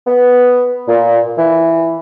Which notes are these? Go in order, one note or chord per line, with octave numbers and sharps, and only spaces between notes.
B3
A#2
E3